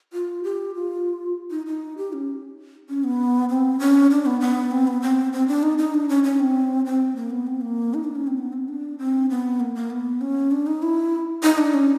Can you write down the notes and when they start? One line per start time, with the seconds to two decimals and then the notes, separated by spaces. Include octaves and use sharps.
0.13 F4
0.44 G4
0.75 F4
1.51 D#4
1.66 D#4
1.98 G4
2.13 C#4
2.89 C#4
3.04 B3
3.50 C4
3.80 C#4
4.11 D4
4.26 B3
4.41 B3
4.71 C4
4.87 B3
5.02 C4
5.33 C4
5.48 D4
5.63 D#4
5.78 D#4
5.94 D4
6.09 C#4
6.24 C#4
6.40 C4
6.86 C4
7.16 A#3
7.31 B3
7.47 C4
7.61 A#3
7.94 D#4
8.04 D4
8.15 C#4
8.27 C4
8.38 B3
8.53 C4
8.68 D4
8.99 C4
9.30 B3
9.60 A#3
9.75 A#3
9.90 B3
10.21 C#4
10.51 D4
10.67 D#4
10.82 E4
11.43 D#4
11.58 D4
11.74 C#4